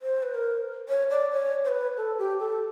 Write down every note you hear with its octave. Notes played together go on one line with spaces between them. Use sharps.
C5
B4
A#4
C#5
D5
C#5
C5
B4
A4
G4
A4